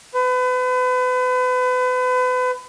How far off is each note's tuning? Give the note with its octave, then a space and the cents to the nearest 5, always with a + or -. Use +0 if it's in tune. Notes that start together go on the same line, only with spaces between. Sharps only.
B4 +35